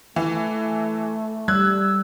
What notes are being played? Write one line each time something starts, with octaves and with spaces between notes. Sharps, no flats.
E3 A3
G3 E6 F#6 G#6